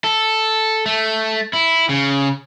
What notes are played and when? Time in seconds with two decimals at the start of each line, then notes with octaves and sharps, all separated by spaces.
0.04 A4
0.86 A3
1.53 E4
1.89 C#3